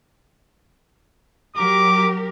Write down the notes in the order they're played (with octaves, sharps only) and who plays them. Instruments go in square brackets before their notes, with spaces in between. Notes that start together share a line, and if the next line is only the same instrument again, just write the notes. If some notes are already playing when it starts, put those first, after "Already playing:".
[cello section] F#3 G4 A#4 [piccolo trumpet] D6